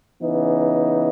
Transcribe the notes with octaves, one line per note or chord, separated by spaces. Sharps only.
C#3 E3 B3 D#4